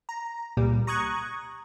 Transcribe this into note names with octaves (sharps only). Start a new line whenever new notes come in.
A#5
C#2 A#2 G3
A#5 C#6 D#6 F#6 G#6